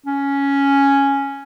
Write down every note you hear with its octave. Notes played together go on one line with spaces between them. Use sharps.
C#4